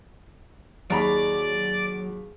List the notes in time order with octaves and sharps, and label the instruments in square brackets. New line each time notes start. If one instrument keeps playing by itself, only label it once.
[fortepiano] D#2 A#5 B5 [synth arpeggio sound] F#3 [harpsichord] G#4 C#5 [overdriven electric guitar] D5